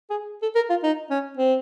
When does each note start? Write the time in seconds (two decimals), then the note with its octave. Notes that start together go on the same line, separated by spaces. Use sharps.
0.10 G#4
0.43 A4
0.55 A#4
0.70 F4
0.83 D#4
1.10 C#4
1.37 C4